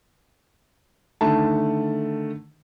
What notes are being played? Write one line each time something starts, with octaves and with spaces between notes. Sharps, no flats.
D3 D#3 A3 A5